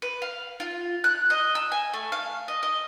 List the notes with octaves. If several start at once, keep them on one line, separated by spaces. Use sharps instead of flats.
B4
F5
F4
F#6
D#5
E6
G#5
A3
F5
D#5
D#5